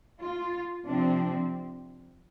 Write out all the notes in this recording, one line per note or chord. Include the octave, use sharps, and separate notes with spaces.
F4
C3 F3 C4 D4